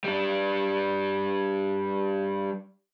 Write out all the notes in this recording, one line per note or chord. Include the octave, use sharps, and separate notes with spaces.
G3 D4